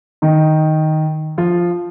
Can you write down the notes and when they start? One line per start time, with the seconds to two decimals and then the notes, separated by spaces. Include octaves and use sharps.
0.22 D#3 D#4
1.38 F3 F4